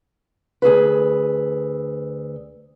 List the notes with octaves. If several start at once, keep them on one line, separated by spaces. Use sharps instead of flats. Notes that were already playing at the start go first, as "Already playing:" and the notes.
D2 G#4 A4 B4